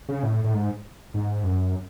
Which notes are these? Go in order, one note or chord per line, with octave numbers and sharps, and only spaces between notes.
C#3
A2
A2
G#2
G#2
F#2